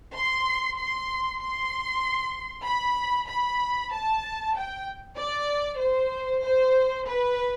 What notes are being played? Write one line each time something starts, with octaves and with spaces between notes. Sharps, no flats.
C6
C6
C6
B5
B5
A5
G5
D5
C5
C5
B4